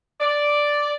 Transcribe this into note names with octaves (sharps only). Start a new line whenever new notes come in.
D5